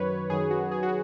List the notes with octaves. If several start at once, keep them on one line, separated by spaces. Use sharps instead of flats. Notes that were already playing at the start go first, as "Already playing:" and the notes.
Already playing: F#2 D#3 F#3 B4 C#5
F#2 D#3 F#3 G#4
F#4
G#4
F#4